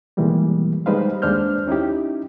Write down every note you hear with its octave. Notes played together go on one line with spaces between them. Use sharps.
B2 D#3 E3 G3 G#3 A#3
G3 G#3 D#4 B4 C5 F5
D#2 G#3 D4 C5 F6 G6
C#4 D#4 E4 G4